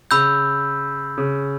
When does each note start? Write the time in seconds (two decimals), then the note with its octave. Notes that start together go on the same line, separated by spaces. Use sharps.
0.11 C#3 B5 E6 G6
1.18 C#3